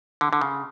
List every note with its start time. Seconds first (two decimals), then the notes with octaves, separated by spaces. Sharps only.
0.21 D3
0.33 D3
0.41 C#3